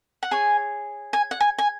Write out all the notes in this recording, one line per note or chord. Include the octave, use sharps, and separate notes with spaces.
F#5
G#4 C#5 G#5
G#5
F#5
G#5
G#5